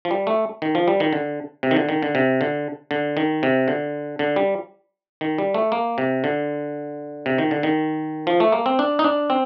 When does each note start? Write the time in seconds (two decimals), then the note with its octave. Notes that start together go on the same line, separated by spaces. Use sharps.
0.05 F3
0.11 G3
0.27 A3
0.62 D#3
0.75 F3
0.88 G3
1.00 D#3
1.13 D3
1.63 C3
1.71 D#3
1.76 D3
1.89 D#3
2.03 D3
2.15 C3
2.41 D3
2.91 D3
3.17 D#3
3.43 C3
3.68 D3
4.19 D3
4.36 G3
5.21 D#3
5.38 G3
5.54 A3
5.72 A#3
5.98 C3
6.24 D3
7.26 C3
7.38 D#3
7.51 D3
7.63 D#3
8.27 F3
8.40 A3
8.52 A#3
8.66 C4
8.79 D4
8.99 D#4
9.04 D4
9.30 C4